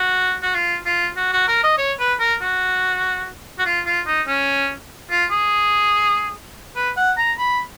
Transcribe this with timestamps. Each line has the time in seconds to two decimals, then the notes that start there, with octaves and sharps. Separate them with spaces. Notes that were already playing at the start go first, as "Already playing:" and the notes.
Already playing: F#4
0.42 F#4
0.54 F4
0.86 F4
1.16 F#4
1.32 F#4
1.48 A#4
1.63 D#5
1.78 C#5
1.99 B4
2.20 A#4
2.41 F#4
3.59 F#4
3.66 F4
3.86 F4
4.07 D#4
4.27 C#4
5.11 F4
5.31 G#4
6.76 B4
6.97 F#5
7.18 A#5
7.38 B5